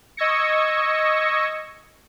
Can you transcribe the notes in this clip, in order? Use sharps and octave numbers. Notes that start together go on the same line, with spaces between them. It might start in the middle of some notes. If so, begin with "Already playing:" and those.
D#5 C#6 E6 G#6 A#6 C#7